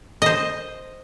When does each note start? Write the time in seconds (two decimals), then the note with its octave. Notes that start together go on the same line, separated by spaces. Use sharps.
0.22 C5 D#5